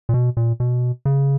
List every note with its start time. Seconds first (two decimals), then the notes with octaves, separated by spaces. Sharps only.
0.09 A#2
0.14 B2
0.37 A#2
0.60 B2
1.05 C#3